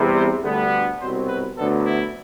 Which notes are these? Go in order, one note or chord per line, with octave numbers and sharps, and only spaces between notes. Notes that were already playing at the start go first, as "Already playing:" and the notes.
Already playing: E2 C3 G3
C5
D2 D3 G3 B3
C2 B2 F#3 C4 C5
B4
D2 D3 F#3 B3 A4
E4